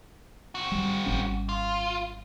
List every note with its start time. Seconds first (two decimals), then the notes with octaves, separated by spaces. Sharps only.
0.55 C4 F#4
0.72 G3
1.06 G#1 G3 C#4
1.49 F4